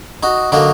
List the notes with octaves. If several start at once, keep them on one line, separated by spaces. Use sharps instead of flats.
D#4 F#4
D3 F#3 A#3 D#4 F#4